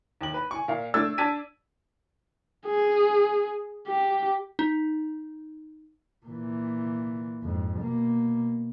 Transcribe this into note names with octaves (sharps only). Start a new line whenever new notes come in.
D#2 F#7
B4
G#5 C#6
A#2 F5
A3 D4 E6 G#6 A6
D4 A5 G#6 B6 D#7
G#4
G4
D#4
A#2 E3
F2 G#2
B2 A#3